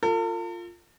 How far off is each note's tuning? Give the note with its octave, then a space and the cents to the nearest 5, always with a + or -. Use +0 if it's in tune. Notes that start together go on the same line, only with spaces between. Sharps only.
F4 +0 A4 +45